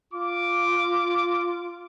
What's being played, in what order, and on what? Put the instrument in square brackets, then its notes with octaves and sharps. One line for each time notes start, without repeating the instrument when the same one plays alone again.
[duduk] F4 [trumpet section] D6